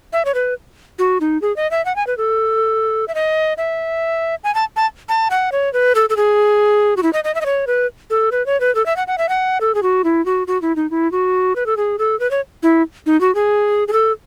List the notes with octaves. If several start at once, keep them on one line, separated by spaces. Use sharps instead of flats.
E5
C#5
B4
F#4
D#4
G#4
D#5
E5
F#5
G#5
B4
A4
E5
D#5
E5
G#5
A5
A5
A5
F#5
C#5
B4
A4
A4
G#4
F#4
E4
D#5
D#5
E5
D#5
C#5
B4
A4
B4
C#5
B4
A4
E5
F#5
F#5
E5
F#5
A4
G#4
F#4
E4
F#4
F#4
E4
D#4
E4
F#4
B4
A4
G#4
A4
B4
C#5
E4
D#4
F#4
G#4
G#4
A4